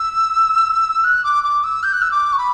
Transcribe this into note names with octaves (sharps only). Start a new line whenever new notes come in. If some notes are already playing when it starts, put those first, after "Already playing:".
Already playing: E6
F#6
D6
D6
E6
G6
F#6
E6
D6
C#6
B5